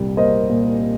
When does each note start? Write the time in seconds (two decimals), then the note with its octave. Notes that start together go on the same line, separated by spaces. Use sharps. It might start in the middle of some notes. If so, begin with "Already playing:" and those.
Already playing: C2 A#2 G3
0.17 A#3 C5 D#5
0.49 A#2